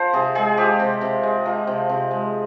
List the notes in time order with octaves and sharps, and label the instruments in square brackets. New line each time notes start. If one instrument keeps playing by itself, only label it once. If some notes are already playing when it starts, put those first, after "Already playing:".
Already playing: [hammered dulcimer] F3 C5
C3 G#4
G#3 G#4
F3 G4
C3
C3
G#3
F3
C3
C3
G#3